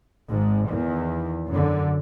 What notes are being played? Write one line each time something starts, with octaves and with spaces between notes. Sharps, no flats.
G#1 G#2
E2 D#3
F#2 D3